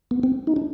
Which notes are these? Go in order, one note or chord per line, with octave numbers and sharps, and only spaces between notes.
B3
C4
D#4
D4